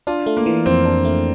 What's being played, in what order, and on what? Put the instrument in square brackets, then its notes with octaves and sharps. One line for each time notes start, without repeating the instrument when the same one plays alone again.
[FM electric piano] D4 [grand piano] F4
[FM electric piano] A3
[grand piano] A#3
[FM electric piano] E3
[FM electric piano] F2 [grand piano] C4
[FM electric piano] D4
A3